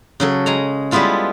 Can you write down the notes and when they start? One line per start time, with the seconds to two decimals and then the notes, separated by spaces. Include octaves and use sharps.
0.20 C#3 F#3 A4
0.46 G#3 G#5 A#5
0.91 G3 G#3 B3 E4 F4 A4